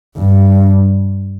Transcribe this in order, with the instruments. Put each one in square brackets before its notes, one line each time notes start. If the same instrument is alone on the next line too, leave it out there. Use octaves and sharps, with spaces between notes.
[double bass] G2